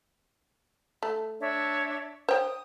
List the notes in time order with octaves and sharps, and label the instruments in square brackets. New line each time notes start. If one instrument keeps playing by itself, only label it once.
[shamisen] A3
[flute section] D4 C#5 E5
[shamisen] C5 C#5 G5 [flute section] D#6